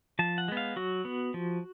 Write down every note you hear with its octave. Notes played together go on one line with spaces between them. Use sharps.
F3 A5
F#5
G#3 B3
F5
F#3 F#4
B3
F3